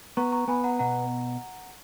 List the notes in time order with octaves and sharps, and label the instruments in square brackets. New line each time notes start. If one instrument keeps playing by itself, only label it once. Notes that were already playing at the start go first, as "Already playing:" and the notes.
[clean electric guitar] B3 [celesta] A#5 C#6
[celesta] A#5 C#6
[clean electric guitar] B3 [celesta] G#5 B5
[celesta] F#5 A#5
[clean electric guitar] B2 [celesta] F#5 A#5